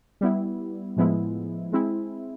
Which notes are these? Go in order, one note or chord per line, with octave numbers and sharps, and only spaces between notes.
G3 B3 E4
A2 F3 G#3 B3 E4
G#3 C4 E4